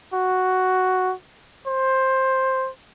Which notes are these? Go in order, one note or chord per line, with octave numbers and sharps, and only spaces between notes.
F#4
C5